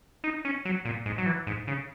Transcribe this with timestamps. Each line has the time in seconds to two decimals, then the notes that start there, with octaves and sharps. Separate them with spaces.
0.24 D#4
0.45 C#4
0.65 F#3
0.85 A#2
1.06 G#2
1.18 F#3
1.26 E3
1.47 G#2
1.67 C#3